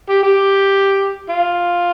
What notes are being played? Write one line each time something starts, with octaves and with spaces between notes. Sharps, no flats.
G4
G4
F4